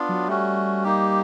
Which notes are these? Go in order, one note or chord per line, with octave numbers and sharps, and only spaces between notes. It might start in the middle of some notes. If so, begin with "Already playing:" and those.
Already playing: B3 D4 F4
F#3
G3 A3 C#4 F#4
A#3 D#4 G4